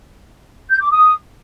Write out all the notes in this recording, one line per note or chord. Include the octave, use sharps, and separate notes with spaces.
G6
D6
D#6